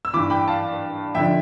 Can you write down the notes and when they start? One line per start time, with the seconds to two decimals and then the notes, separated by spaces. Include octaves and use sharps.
0.05 E6
0.13 G2 E3 B5 D6
0.30 G5 B5
0.48 F5 A5
1.15 F2 D3 F3 E5 G5